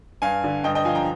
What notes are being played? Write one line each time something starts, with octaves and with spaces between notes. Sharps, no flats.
G2 F5 G#5
D3
G2 D#5 G5
D#5 G5
F3 F5 G#5
G5 A#5